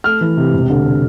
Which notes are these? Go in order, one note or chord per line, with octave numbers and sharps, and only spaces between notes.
A3 F6
E3
C3
E1
D3